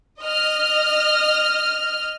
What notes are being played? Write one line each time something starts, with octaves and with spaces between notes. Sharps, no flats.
D#5 F6